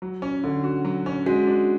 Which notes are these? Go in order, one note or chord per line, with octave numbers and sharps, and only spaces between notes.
F#3
C#4
D3
F#4
F#3
C#4
G#3 F#4
D4